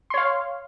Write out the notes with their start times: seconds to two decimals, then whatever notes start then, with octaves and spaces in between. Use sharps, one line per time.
0.10 C6
0.14 C#5
0.18 F5